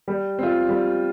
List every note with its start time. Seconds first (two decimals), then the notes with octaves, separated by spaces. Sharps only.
0.08 G3
0.39 C4 F4
0.69 G3